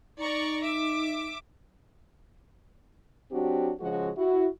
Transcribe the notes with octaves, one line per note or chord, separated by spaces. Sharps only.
D#4 D5 A#5 C#6
E5 D6
F#3 C4 D4 F#4 G4
C#3 F3 G#3 F#4
E4 F#4